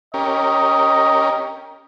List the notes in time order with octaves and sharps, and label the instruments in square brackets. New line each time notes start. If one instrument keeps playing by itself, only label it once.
[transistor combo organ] C#4 G4 A#4 [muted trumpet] D#5